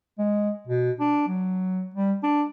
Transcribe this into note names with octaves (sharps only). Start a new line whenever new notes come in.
G#3
B2
D4
F#3
G3
D4